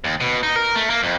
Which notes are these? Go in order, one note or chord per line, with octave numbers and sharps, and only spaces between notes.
D#2
B2
D#4
A#4
A3
A#3
F2